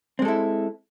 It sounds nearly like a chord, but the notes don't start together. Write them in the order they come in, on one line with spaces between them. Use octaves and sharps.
C4 G#3 A4 E4